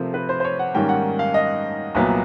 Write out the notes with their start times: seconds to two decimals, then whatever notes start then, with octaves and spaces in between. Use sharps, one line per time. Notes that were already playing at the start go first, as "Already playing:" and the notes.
Already playing: C3 F3 A3 C4 A#4 C5
0.14 B4
0.29 C5
0.40 C5
0.44 C#5
0.59 F#5
0.75 G#2 D#3 G3 A#3 C#4 G5
0.89 F#5
1.19 F5
1.34 D#5
1.95 C2 A#2 F#3 B3